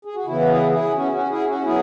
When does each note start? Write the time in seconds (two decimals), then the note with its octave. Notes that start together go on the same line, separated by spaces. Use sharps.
0.05 G#4
0.15 F#4
0.25 C#3 E3 B3 E4
0.41 B4
0.48 E4 G#4
0.71 E4 G#4
0.95 C#4 F#4
1.12 C#4 F#4
1.29 E4 G#4
1.47 C#4 F#4
1.64 F#3 B3 E4 G#4